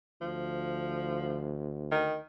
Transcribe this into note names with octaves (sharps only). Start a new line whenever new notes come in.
D2 F3
D#3